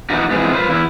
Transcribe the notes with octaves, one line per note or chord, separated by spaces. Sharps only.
E3 G3 B3 D4 D#4 F#4
C3 E3 F3 G#3 B3
F4 B4 C5
E2 E4